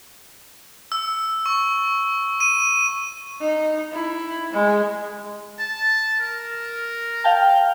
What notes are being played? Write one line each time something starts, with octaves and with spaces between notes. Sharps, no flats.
E6
C#6
D#7
D#4
E4
G#3
A5
A#4
F5 G5 A5